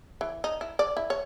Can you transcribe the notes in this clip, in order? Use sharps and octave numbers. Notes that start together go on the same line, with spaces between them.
E3
D#4
E4
D5
E4
C#5